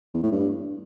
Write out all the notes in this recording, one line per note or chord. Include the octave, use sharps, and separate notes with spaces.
E2
A2
G2